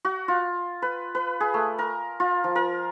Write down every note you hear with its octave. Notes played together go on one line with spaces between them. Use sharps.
F#4
F4
B4
B4
G#4
A3
A#4
F4
F3
A#4